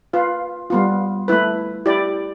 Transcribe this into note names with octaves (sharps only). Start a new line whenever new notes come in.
F4 B4 F5
G3 B3 F4
A3 E4 B4
E4 G4 D5